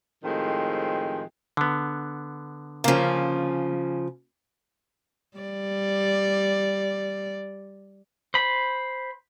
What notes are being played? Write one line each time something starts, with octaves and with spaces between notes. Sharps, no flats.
A2 D#3 F3 G#3 C4 G4
D3 B3
C#3 F3 A#3 C#4
G3 D5
C5 B5